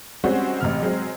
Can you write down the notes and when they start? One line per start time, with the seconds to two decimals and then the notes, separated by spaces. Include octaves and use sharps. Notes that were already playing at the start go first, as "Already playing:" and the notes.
0.24 G3 G#3 C4 C#4 F#4
0.60 A1 C3 F6
0.82 F#3 G#3 C4